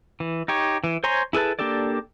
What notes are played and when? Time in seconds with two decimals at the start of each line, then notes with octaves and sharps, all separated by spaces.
0.20 E3
0.48 D#4 G4 C#5
0.84 E3
1.04 C5 C#5 G#5 A#5 C6
1.33 E4 G#4 A4 B4 A5
1.59 A#3 D4 G4 A4 D5